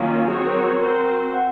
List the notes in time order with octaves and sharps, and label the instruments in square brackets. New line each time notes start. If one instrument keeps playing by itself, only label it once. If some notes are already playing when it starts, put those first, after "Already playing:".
Already playing: [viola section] D#3 F#3 A#3 C#4 F4
[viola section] F#3 C4 F#4 C#5 [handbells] G#4
[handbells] A#4
[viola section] C4 F#4 C5 [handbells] A#4
[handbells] F#5